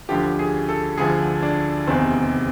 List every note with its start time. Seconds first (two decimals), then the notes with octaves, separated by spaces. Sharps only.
0.09 D2 D3 F3 G4
0.39 G#4
0.69 A4
0.98 D2 D3 F3 G#4
1.43 D4
1.87 F1 E2 C3 D#3 C4